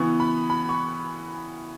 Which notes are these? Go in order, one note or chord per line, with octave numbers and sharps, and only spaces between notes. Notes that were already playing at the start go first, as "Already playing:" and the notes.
Already playing: C#3 E3 B3 C#6
B5
B5
C#6